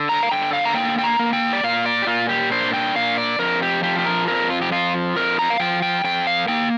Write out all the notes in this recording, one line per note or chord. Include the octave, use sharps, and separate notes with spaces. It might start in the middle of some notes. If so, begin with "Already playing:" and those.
Already playing: D3
A#5
F5
D3 G5
F5
A#5
A#3 G5
G5
A#5
A#3
G5
D5
A#2 F5
D5
G4
A#2 F4
G4
D4 C5
G5
A#2 F5
D5
F2 A#4
G4
F3 G4
G4
A#4
F2 A#4
F4
G4
F3 F4
F2 A#4
A#5
F5
F3 G5
G5
F2 G5
F5
A#3 G5